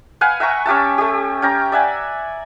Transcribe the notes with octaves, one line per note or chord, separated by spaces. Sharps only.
B4 F5 F#5 G#5
E5 F#5 A#5 C#6
C#4 G4 E5 A5
A3 G4
C#4 G5 A#5
D5 E5 F#5 G#5